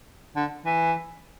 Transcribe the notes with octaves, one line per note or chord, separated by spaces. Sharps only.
D3
E3